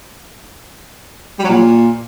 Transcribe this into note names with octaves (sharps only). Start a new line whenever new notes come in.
G3
F#3
A#2